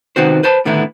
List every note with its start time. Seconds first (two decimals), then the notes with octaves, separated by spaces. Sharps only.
0.16 C3 D#3 B3 F#4 C5
0.43 B4 C5 A5 B5
0.65 A2 D3 D#3 B3 E4